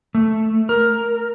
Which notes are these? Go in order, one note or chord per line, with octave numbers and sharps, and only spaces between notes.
A3
A#4